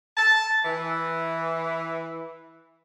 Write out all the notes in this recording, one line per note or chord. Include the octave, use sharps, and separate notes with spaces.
A5
E3